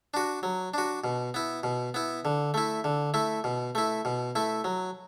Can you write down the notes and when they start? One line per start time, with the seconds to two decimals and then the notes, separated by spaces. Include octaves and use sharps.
0.14 D4 F#4
0.43 F#3
0.74 D4 F#4
1.04 B2
1.34 B3 E4
1.63 B2
1.94 B3 E4
2.25 D3
2.54 A3 E4
2.84 D3
3.14 A3 E4
3.44 B2
3.75 A3 E4
4.05 B2
4.35 A3 E4
4.64 F#3